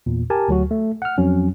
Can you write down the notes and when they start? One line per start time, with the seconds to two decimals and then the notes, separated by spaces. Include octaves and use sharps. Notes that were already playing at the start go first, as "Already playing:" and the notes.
0.06 E2 A#2
0.30 G4 A#4 G#5 A5
0.48 D2 F#3 F#4
0.71 A3
1.02 F#5 F6
1.18 F2 F#3 C#4